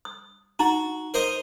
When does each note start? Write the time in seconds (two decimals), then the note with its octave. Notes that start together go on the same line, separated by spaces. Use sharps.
0.05 D#6
0.59 D#4 F#4 A#5
1.14 A#4 C5 D#5